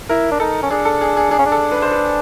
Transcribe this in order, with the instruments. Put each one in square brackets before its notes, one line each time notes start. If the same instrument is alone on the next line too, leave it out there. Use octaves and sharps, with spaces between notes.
[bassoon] E4 [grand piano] A#4
[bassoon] D4
[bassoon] D#4 [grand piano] A4
[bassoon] C#4
[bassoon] D4 [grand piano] G#4
[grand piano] A4
G#4
G#4
[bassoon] D4 [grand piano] G#4
[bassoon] C#4
D4
[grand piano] A4
B4
C5
B4